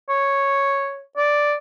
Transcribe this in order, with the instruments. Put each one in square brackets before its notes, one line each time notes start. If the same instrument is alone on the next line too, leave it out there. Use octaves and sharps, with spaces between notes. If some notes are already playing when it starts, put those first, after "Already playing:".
[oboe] C#5
D5